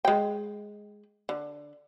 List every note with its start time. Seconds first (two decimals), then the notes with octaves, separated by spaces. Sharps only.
0.05 G#3 G5
1.29 D3